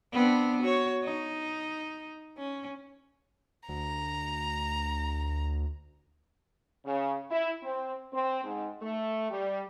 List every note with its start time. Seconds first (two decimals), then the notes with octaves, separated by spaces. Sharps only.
0.13 B3 C4 D4
0.62 F#4 C#5
1.05 D#4
2.38 C#4
3.69 D2 A#5
6.85 C#3
7.30 E4
7.63 C4
8.13 C4
8.44 G#2
8.82 A3
9.30 G3